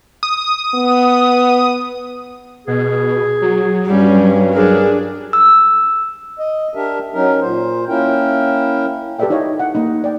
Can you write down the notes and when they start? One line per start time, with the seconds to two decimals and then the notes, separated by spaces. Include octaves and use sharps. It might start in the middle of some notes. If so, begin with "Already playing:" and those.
0.23 D#6
0.75 B3
2.67 B2 G#4
3.41 F#3
3.86 G2 G3 C#4
4.53 D4 G#4 A#4
5.33 E6
6.39 D#5
6.75 D4 G4 A#4 E5
7.14 F#3 C#4 D#4 A#4
7.41 A#2 C5
7.89 A#3 C#4 E4 A#4 G5
9.19 G4 A4 B4 D5 E5 G5
9.30 D#4 E4 G4 C#5 D#5 F5
9.59 F#5
9.75 A#3 D#4
10.04 D5 G5